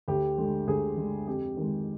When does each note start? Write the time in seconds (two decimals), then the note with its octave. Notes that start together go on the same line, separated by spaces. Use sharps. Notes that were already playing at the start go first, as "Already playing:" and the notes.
0.08 D2 G4
0.38 D3 G#3
0.67 D2 G#4
0.97 D3 G#3
1.27 F2 G4
1.57 D#3 G#3